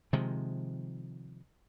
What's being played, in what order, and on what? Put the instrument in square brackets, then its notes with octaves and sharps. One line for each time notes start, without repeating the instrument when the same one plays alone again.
[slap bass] C3 D#3 F3 G#3